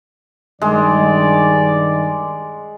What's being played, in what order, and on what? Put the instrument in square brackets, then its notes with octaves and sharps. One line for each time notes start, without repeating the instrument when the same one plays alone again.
[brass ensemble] G2 D#3 [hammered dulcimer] G#3 [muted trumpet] D5